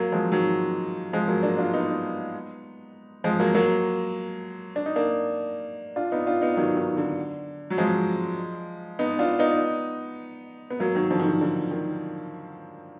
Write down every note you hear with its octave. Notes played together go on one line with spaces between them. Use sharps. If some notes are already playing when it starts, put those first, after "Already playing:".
Already playing: F#3 A#3
F3 G#3
D#3 F#3
F3 G#3
F#3 A#3
A#3 D4
D4 F4
B3 D#4
F3 G#3
F#3 A#3
F#3 A#3
D4
D#4
A#3 D4
D4 F4
B3 D#4
D4 F4
B3 D#4
D#3 F#3
D#3
D3
F#3
F3 G#3
B3 D#4
D4 F4
B3 D#4
B3
F#3 A#3
D#3 F#3
D3 F3
D#3
D3
D3
D#3